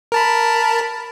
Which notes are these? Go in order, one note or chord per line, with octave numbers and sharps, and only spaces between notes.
A#4 A5 B5